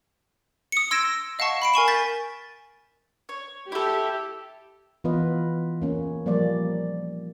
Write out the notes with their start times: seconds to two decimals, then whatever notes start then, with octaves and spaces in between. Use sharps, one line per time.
0.72 D#6 C#7
0.91 C6 E6 G#6 A#6 D7 E7
1.39 D#5 F5 F#5 A5 C#6
1.62 B5 C7 D7
1.74 A#4 G#5 C#6 E7
1.88 G6 A6 B6
3.29 C#5
3.72 E4 G4 A4
5.04 E3 B3 F4 B4 D#5
5.82 A#3 C#4
6.26 F3 G3 A#3 D5